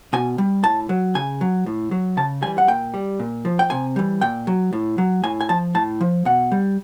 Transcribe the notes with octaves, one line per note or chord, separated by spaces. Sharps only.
B2 G#5
G3
A2 A5
F#3
C#3 G#5
F#3
A2
F#3
C#3 A5
E3 G3 G#5
F#5
A#2 G5
G3
A#2
F3
G5
C3 G#5
E3 G3
A#2 G5
F#3
A2
F#3
A2 G#5
G#5
F3 A5
A2 A5
F3
B2 F#5
G3